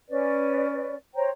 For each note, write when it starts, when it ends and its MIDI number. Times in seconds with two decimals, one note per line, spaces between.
0.10 0.95 61
0.10 0.95 71
0.10 0.95 74
1.15 1.29 72
1.15 1.29 73
1.15 1.29 79
1.15 1.29 82